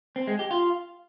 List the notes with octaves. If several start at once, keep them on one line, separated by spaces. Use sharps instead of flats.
C4
G#3
G4
F4